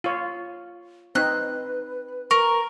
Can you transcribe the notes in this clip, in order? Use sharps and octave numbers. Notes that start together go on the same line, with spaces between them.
F4 C#5
C4 D#4 B4 F#6
A#4 C#6